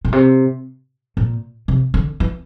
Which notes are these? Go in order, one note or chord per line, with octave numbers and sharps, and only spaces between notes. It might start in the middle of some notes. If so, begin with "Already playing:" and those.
A#2
C3
A#2
C3
D3
E3